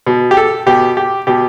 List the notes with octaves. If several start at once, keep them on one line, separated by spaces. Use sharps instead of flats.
B2
G4
A4
B2 G4
G4
B2 G4